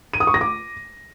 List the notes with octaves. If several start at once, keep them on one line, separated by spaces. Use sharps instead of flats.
D#7
D#6
C#6
A#6
D6